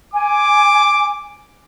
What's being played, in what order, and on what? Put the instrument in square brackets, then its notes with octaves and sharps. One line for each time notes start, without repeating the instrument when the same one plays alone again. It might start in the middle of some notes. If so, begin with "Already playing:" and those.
[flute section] G#5 [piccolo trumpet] D6